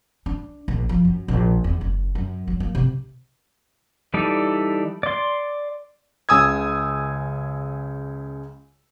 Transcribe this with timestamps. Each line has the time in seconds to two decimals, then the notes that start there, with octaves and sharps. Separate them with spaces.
0.26 D4
0.68 A#1
0.89 F3
1.05 F#2
1.28 A#1
1.64 E2
1.81 F#1
2.15 F#2
2.47 F#3
2.60 A#3
2.75 C3
4.14 E3 G3 D#4 A4 D5
5.03 D5 C6
6.29 C#2 C#3 G#5 D#6 E6 G#6